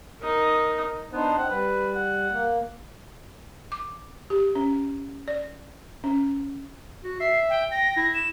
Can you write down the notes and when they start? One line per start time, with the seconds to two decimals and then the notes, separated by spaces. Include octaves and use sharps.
0.21 D#4 A#4
1.13 B3 D4 D#4 C5
1.37 C4 F#5
1.50 G3 B4
1.95 F#5
2.30 A#3
3.72 D6
4.30 G4
4.55 C#4
5.28 D5
6.04 C#4
7.04 F#4
7.20 E5 C7
7.50 G5
7.71 G5 A#6
7.97 E4
8.14 E7